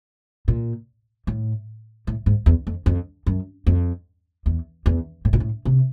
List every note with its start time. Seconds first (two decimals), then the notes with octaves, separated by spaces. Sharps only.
0.48 A#2
1.27 A2
2.07 A2
2.26 G#2
2.46 E2
2.67 F2
2.86 F2
3.26 F#2
3.67 F2
4.46 E2
4.86 E2
5.25 A2
5.33 A#2
5.40 A2
5.65 C3